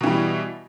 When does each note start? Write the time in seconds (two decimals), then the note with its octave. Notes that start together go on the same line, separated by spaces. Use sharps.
0.01 B2
0.04 E3
0.07 G3